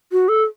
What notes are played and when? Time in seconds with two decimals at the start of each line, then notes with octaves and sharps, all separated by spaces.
0.12 F#4
0.29 A4